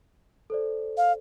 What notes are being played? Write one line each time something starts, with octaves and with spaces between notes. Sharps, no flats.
A4 C5 D5
F5